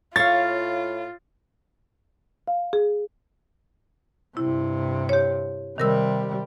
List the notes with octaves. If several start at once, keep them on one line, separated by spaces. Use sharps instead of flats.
A2 F4 C#5 F5 A6
F5
G#4
G2 C3 E4
G4 C#5
C3 D#3 G3 A#4 E6